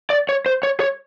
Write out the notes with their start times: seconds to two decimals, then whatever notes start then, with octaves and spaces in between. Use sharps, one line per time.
0.10 D5
0.29 C#5
0.46 C5
0.63 C#5
0.80 C#5